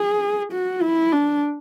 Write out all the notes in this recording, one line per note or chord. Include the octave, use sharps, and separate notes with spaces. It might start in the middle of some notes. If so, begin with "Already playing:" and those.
Already playing: G#4
F#4
E4
D4